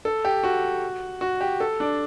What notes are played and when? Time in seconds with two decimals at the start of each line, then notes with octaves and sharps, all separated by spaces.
0.05 A4
0.25 G4
0.44 F#4
1.21 F#4
1.41 G4
1.60 A4
1.80 D4